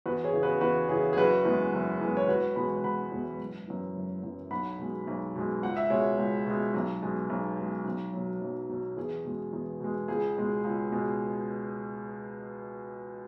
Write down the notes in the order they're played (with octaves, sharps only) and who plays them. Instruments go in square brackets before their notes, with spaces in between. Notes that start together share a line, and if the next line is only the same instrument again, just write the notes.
[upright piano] E2 F#4 B4
G#4 C#5
C#3 E3
F#4 B4
E2 F#4 B4
C#3 E3 G#4
G#4
F#1 F#4 B4
E2 E3 G#3
F#1
E2 E3 G#3
C#5
E1 F#4 B4
E2 B2 G#3 F#5 B5
E1 F#5 B5
E2 B2 G#3
F#1
F#2 E3
F#1
F#2 E3
B1 F#5 B5
B2 G#3
B1
B2 G#3
C#2 F#5
E5
B2 G#3 C#5 F#5
C#2
B2 G#3
B1
B2 G#3
B1
B2 G#3
B1
B2 F#3
B1
B2 F#3
E2 G#4
B2 G#3
E2
B2 G#3
C#2 G#4
B2 G#3
C#2
B2 G#3